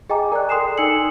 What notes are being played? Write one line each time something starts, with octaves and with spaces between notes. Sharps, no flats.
G#4 D#5 G5 G#5 A#5 D6
A#4 D5 G#5 F#6
A4 G5 C6 D#6 C7 E7
D#4 G#5 E6 C#7 F#7